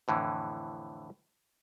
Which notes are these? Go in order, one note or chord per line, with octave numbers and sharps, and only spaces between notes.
F2 A2 D3 E3